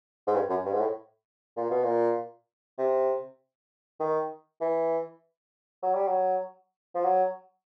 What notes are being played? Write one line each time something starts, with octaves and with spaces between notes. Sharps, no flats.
G#2
G2
F#2
G2
G#2
A2
A#2
B2
A#2
C3
D#3
E3
F#3
G3
F#3
F3
F#3